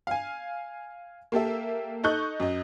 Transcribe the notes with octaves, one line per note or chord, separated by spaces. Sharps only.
F5 G#5
A#3 G4 A4 E5
D#4 A4 D#5 C#6 F#6 G6
F#2 D#5